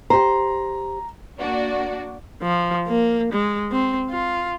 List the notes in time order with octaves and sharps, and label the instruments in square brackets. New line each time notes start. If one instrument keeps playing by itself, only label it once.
[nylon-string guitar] G4 C5 [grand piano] A#5
[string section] A#3 D4 F#4 D5
[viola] F3
A#3
G#3
C4
F4